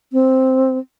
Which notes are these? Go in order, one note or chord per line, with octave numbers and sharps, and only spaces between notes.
C4